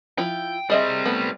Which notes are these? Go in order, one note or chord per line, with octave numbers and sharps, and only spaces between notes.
F3 E4 F4 G5
G3 C4 G#4 D#5 E5
A3 B3